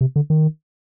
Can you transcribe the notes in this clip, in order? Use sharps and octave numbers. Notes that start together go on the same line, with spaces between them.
C3
D3
D#3